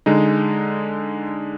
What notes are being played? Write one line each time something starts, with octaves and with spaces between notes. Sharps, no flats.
D3 G#3 D#4